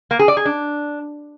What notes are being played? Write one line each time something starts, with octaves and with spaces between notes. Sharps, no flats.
A#3
G#4
D5
G#4
D4